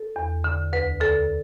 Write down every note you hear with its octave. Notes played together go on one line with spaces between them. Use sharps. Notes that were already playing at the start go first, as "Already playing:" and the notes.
Already playing: A4
E2
D3
D2 B4
D3 A4